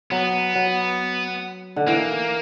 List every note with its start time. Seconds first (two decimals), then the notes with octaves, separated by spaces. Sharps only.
0.11 F#3 B3
0.55 F#3
1.76 D3
1.87 E3 A#3